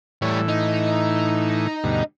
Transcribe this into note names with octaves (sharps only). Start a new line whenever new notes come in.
A2 E3 G3 C#5
D#4
D2 G2 B2